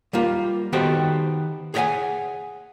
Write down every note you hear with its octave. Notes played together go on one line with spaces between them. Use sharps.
G3 A#3 F4
D#3 B3 F#4 G4 A4 C5
G#4 C#5 D5 E5 F#5 G#5